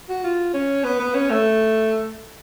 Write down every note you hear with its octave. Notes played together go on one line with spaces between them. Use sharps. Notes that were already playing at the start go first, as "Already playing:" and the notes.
F#4
F4
C#4
B3
B3
C#4
A3